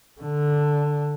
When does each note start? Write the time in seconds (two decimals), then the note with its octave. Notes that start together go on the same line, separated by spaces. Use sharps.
0.21 D3